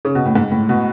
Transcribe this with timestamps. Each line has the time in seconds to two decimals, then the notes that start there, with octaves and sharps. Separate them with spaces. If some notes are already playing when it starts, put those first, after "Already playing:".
0.05 C#3
0.15 B2
0.25 A2
0.35 G#2
0.51 A2
0.69 B2